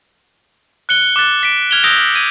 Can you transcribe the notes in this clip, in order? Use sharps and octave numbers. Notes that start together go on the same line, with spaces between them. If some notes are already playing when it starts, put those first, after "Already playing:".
F#6 C#7 G7
D6 F#6 A6
B6 D7
F6 G#6 F7 G7
D#6 E6 G6 A#6 D7
G#6 D#7